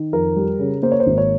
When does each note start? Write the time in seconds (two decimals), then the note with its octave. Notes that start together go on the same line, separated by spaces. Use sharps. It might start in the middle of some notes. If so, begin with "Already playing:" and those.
Already playing: D#3
0.13 F2 A#4
0.36 G3
0.59 C#3
0.83 A#3 C5
0.91 C#5
1.00 C5
1.07 G#1
1.18 C#5